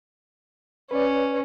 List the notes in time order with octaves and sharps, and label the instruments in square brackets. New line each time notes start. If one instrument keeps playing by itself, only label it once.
[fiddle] C#4 [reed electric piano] B4 C#5 D5